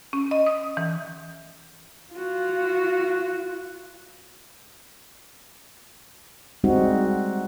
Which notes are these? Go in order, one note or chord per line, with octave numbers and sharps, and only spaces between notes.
C#4
D#5
D#6
E3
F4 F#4
G3 G#3 C4 D#4 F#4